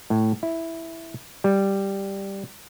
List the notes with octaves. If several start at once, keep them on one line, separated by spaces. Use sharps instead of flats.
A2
E4
G3